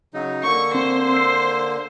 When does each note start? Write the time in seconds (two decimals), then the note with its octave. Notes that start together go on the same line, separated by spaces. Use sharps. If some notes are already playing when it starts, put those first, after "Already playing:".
0.14 C#3 F#3 D#4
0.43 D3 A#3 C#6
0.75 C4 C5
1.14 E6 C7